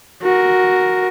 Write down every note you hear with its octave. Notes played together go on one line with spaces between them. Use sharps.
F#4 A#4